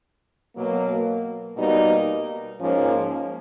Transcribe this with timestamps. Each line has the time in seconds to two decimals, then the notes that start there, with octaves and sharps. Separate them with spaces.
0.55 B2 F#3 A#3
1.57 B2 G3 A#3 D#4
2.59 G#2 F3 A#3 C#4